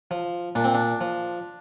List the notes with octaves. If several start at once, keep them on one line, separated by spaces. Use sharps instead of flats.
F3
A#2 D4
C4
D4
F3